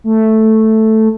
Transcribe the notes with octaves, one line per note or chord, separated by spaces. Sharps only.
A3